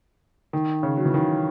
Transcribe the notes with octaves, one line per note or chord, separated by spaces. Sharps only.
D#3
C#3
F#3
E3
D#3